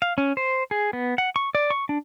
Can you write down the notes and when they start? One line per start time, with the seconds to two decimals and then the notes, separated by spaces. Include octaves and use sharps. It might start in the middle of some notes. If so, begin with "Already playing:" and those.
0.02 F5
0.18 C#4
0.37 C5
0.71 G#4
0.93 B3
1.18 F#5
1.36 C#6
1.55 D5
1.70 C#6
1.89 D4